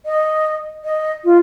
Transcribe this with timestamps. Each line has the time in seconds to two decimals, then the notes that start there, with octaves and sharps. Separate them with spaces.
0.05 D#5
0.84 D#5
1.24 F4